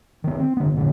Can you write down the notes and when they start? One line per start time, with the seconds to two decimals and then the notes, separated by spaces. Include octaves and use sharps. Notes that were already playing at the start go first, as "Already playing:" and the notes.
0.24 D#3 B3
0.39 C4
0.57 D3 B3
0.74 A1 A#2 D3 C#4